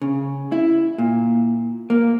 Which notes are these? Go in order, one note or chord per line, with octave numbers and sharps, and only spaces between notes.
C#3
E4
A#2
A#3